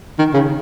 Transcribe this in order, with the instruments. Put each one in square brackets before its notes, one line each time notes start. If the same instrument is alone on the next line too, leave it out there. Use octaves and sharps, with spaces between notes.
[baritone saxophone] D#3
C#3